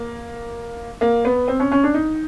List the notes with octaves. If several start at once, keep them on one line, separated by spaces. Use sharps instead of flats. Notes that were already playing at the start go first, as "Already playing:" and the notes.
Already playing: A#3
A#3
B3
C4
C#4
C#4
D4
D#4